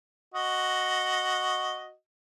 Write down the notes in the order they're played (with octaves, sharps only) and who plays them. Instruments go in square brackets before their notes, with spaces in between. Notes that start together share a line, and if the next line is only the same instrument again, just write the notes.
[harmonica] F#4 D#5